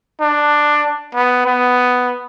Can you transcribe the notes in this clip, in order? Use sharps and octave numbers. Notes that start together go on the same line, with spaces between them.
D4
B3
B3